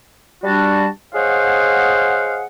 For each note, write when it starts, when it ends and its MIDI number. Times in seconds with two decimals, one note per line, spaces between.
0.44 0.88 55
0.44 0.88 62
0.44 0.88 66
0.44 0.88 81
1.15 2.44 68
1.15 2.44 72
1.15 2.44 73
1.15 2.44 75
1.15 2.44 77
1.15 2.44 78